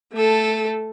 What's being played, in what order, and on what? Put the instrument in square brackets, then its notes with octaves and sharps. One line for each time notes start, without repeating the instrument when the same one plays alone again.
[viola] A3 A4